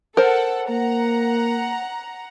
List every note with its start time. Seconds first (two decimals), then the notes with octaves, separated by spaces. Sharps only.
0.17 A4 A#4 C5 F#5
0.69 A#3 F#5 A#5